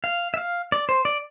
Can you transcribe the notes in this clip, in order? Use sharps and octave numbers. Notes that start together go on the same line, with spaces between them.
F5
E5
F5
D5
C5
D5